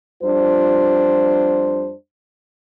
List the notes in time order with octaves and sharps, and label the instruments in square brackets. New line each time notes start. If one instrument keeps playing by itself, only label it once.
[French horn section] F2 G3 D4 F4 C5